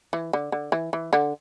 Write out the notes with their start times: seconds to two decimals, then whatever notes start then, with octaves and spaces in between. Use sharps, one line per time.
0.13 E3
0.33 D3
0.52 D3
0.72 E3
0.93 E3
1.13 D3